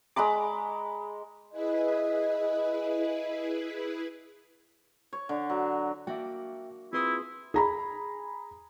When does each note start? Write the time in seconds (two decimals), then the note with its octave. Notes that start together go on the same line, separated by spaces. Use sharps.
0.16 G#3 A#5 B5 D6
1.51 E4 G#4 B4 D#5
5.13 C#5
5.29 D3
5.50 F#3
6.07 A#3 D4 F#4 E5 G5
6.93 C4 E4 F4 G#4 B4 C6 D#6
7.54 G#4 A#5 B5